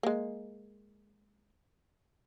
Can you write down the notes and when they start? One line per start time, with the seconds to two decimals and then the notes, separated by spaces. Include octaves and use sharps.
0.03 G#3 A#3